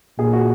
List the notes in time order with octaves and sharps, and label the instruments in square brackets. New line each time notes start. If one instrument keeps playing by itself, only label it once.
[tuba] A#2 [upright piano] G#4
[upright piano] F#4